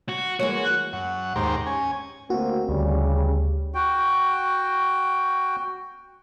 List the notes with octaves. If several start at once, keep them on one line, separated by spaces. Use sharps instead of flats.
F#4
E3 G#3 A#3 F#4 C#5
F#6
F#2 F#5
D#2 G#2 G4 C5 A#5
C#4 G#5
D2 A#3 C4 F#4
D2 C#3 G3
F#4 G5